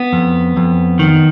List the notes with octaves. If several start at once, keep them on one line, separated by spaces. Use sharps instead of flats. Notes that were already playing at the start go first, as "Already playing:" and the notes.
Already playing: B3
F2
F2
D#3